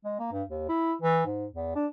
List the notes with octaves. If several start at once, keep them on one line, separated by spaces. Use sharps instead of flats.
G#3
A#3
G2
D#2
E4
E3
G#2
E2
D4